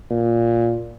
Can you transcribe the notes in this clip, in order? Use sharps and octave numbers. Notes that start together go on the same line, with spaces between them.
A#2